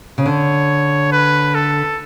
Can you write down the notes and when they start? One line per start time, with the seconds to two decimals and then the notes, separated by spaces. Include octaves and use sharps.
0.18 C#3
0.26 D3 C#5
1.12 B4
1.55 A4